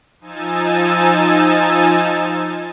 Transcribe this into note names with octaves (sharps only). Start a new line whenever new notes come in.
F3 D#4 G#5 E6 A6